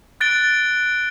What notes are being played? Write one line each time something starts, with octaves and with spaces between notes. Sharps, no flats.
F#6 A6 D7 G7